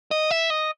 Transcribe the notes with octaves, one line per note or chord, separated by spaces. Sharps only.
D#5
E5
D#5